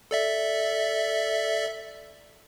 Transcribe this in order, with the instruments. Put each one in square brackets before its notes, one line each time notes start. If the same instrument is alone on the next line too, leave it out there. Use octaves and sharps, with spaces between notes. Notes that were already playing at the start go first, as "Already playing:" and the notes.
[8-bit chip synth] A4 D5 E5